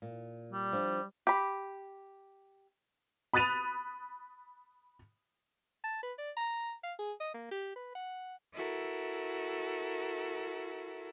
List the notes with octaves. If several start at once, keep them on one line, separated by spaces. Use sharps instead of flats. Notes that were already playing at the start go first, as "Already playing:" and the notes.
A#2
G3
F3 D4
G4 B5
B5 D#6 F#6 A6 D#7 F7
A5
B4
D5
A#5
F5
G#4
D#5
A#3
G4
B4
F#5
E4 F#4 A4 A#4